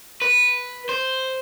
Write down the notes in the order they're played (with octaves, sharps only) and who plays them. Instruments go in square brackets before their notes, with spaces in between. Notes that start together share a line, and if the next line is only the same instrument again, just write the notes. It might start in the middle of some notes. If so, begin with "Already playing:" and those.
[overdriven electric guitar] B4
C5